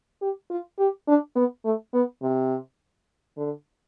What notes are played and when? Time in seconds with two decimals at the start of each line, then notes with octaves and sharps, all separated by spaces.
0.22 G4
0.50 F4
0.79 G4
1.08 D4
1.36 B3
1.65 A3
1.93 B3
2.22 C3
3.37 D3